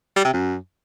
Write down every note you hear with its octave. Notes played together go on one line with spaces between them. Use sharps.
G3
C3
F#2